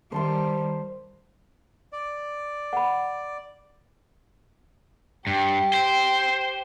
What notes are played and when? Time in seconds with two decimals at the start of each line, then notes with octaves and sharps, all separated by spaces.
0.12 D#3 G3 C5 A5 C6
1.93 D5
2.73 F#5 B5
5.27 G2 G4
5.74 C5